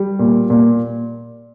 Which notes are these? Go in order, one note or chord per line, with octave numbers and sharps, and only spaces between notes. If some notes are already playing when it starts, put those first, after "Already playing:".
Already playing: G3
A#2
A#2